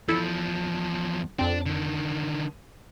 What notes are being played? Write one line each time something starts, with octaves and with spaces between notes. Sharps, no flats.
E2 F3 E4 A4
F2 C4 D4
D3 D#3